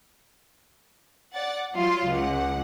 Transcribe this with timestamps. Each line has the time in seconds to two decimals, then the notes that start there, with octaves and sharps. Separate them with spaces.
1.34 D5 F#5 A6
1.74 F#3 F4 C6
2.06 C#2 F#5